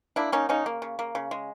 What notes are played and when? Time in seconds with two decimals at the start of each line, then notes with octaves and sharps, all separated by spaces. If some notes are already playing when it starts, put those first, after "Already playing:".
0.16 A#3 D4 E4
0.32 A#3 C#4 D#4
0.49 C#3 C#4 D#4
0.66 A#3
0.82 C#3
0.99 A#3
1.15 C#3
1.31 G#3